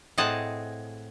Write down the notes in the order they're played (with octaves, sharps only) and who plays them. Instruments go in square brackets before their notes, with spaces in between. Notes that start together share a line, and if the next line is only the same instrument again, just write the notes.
[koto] A2 C4 G#4 D#5 F#5 A5